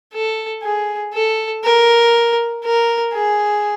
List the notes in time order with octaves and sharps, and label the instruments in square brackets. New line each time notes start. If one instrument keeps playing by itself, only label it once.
[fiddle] A4
G#4
A4
A#4
A#4
G#4